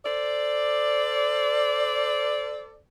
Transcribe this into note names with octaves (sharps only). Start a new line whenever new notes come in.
A4 C5 D5